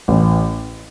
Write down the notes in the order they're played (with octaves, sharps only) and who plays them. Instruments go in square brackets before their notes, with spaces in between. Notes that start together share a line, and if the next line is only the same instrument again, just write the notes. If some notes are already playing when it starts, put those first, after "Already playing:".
[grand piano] A1